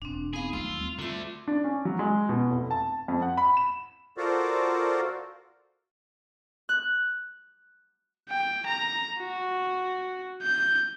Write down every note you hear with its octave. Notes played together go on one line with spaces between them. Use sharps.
E1 C4 D4
B3 D#4 G#4 F5
D#2 F#3 A3 F4 E6
G3 C4
D3 A3 F4 C6
D4
C#4
F#3
G#3
B2
F1
A5
F2
F#5
B5
E7
F4 F#4 A4 A#4 C5 D5
F#6
G5
A#5
F#4
G6